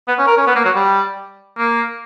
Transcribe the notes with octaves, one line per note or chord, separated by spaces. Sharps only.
B3
C#4
A#4
C#4
B3
A#3
F#3
G3
A#3